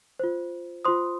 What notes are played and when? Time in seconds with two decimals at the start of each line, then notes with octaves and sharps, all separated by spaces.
0.19 F4 C5
0.85 F4 C5 C6 D#6